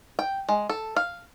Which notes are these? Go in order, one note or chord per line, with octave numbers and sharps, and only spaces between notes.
G5
G#3
A4
F5